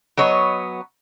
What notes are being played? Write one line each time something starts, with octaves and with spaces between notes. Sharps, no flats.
F#3 B3 C#5 D#5